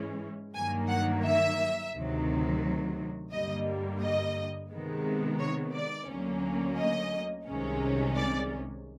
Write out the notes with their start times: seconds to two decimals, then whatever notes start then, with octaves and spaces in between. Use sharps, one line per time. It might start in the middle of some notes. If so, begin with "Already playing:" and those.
Already playing: G#2 E3 G#3 C#4
0.55 G2 D#3 F#3 A#3 G#5
0.89 F#5
1.24 E5
1.93 D2 C3 D#3 F#3
3.31 G2 D3 G3 A#3 D#5
4.01 D#5
4.70 C3 D#3 G#3 B3
5.39 C#5
5.74 D5
6.08 D2 D3 F#3 A#3 C#4
6.77 D#5
7.46 C2 C3 D#3 G#3 C#4
8.16 D5